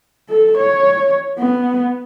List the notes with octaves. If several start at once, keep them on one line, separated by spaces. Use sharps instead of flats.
A4
C#5
B3